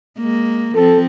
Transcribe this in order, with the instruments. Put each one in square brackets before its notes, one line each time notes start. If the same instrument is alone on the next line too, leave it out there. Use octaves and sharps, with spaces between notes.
[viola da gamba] G#3 A#3
[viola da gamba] F3 C4 [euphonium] A4